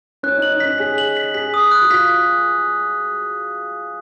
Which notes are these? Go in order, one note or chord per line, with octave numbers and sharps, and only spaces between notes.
C#4 F#6
D#4
F#7
D#4
C#4 B6
G#4 B6
F#7
B6
G#4 B6
D#6
F#6
F#4
F4 B6